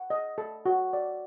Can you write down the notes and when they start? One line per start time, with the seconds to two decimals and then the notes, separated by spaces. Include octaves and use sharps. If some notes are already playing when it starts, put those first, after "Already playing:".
Already playing: F#5
0.10 D#5
0.38 A4
0.66 F#4
0.93 D5